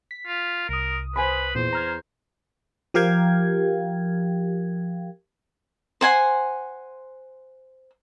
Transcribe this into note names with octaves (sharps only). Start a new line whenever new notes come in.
B6
F4
C2 A#4 D#6
B4 C5 G#5 B5
E2 A#2 C5
A#5 F6 G#6
F3 G4 A#4 F5 G5 G#6
C5 F#5 G#5 C6